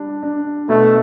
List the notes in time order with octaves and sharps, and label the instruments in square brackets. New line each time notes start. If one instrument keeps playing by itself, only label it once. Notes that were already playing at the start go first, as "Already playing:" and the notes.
Already playing: [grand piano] G3 D4
D4
[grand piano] B2 [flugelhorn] A3